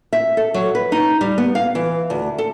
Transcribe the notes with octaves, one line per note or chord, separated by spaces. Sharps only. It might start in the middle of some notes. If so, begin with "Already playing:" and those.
E5
A4
F#3
B4
D#4
G3
B3
F5
E3
D2
A4